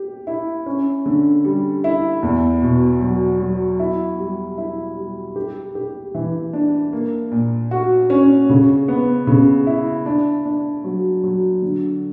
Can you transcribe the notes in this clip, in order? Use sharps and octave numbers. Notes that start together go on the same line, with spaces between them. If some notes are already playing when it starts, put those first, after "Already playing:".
Already playing: G4
E4
C#4
D3
G3
E4
E2
B2
F#3
F#3
E4
G3
E4
G3
G4
G4
E3
D4
A#3
A#2
F#4
C#4
C#3
B3
C#3
E4
D4
D4
F#3
F#3
D3